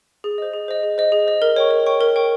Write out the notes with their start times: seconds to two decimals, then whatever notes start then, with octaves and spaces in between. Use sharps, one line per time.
0.24 G#4
0.38 C5 D#5
0.54 G#4
0.68 C5 D#5
0.83 G#4
0.98 C5 D#5
1.12 G#4
1.27 C5 D#5
1.42 A#4
1.56 C#5 G5 C#6
1.71 A#4
1.86 C#5 G5 C#6
2.01 A#4
2.16 C#5 G5 C#6